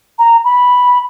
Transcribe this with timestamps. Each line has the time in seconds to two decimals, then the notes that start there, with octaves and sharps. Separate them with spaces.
0.19 A#5
0.45 B5